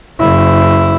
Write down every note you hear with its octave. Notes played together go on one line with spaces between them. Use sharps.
F#1 E4